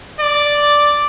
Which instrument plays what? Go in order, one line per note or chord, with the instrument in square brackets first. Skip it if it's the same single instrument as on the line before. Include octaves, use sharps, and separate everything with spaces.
[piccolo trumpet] D5